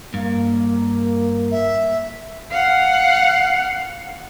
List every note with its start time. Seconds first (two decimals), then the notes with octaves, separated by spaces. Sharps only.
0.14 G2 A#3
1.51 E5
2.52 F5 F#5